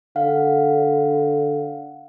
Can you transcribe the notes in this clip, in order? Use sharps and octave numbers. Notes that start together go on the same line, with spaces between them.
D3 F5 F#5